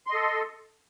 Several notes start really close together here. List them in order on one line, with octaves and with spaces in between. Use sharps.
C6 D#5 A4